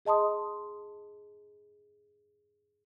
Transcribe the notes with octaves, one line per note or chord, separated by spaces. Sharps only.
G#4 D#5 A5 C6 D#6